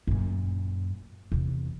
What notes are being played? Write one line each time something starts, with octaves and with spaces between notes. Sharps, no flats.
F#2 A#2
E2 C3